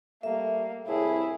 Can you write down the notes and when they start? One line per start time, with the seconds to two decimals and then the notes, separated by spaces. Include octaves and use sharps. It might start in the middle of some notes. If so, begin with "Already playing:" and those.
0.23 G3 A3 A#3 E5
0.87 C2 A2 E4 G#4